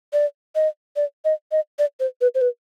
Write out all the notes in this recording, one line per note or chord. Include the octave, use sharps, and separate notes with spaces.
D5
D#5
D5
D#5
D#5
D5
C5
B4
C5
B4